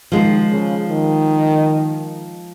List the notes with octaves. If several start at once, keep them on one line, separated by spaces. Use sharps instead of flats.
D#3 F3 G#3 F4
C#3
D#3